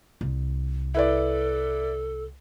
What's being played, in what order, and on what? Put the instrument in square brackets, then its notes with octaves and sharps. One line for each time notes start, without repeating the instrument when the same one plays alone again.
[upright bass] C2
[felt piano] E4 B4 D5 [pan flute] A4